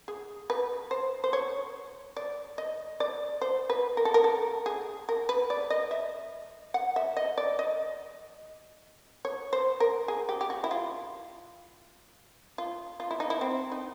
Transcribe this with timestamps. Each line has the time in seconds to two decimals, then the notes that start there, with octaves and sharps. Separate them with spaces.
0.08 G#4
0.50 B4
0.91 C5
1.24 C5
1.33 C#5
2.17 D5
2.58 D#5
3.00 D5
3.41 C5
3.70 B4
3.97 A#4
4.05 A4
4.14 A#4
4.24 A4
4.66 G#4
5.09 A#4
5.29 B4
5.50 D5
5.70 D#5
5.91 E5
6.74 F#5
6.96 E5
7.17 D#5
7.38 D5
7.59 D#5
9.25 C#5
9.53 C5
9.80 A#4
10.08 G#4
10.29 G4
10.41 G4
10.50 F#4
10.64 E4
10.71 F4
12.58 F4
13.00 F4
13.11 E4
13.20 D#4
13.30 E4
13.41 C4
13.72 D#4